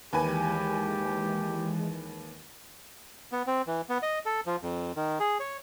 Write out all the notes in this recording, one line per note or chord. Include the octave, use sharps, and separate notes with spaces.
D#2 E3 G#3 G4 B4 G#5
B3
C4
E3
B3
D#5
A4
F3
F2
D#3
G#4
C#5